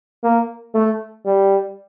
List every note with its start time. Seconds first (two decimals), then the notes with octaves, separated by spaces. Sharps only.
0.24 A#3
0.75 A3
1.26 G3